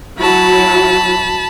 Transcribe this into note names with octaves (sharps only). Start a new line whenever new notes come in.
F#3 E4 F#4 A5 B5